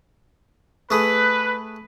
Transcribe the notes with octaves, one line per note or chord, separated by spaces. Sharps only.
A3 G#4 B4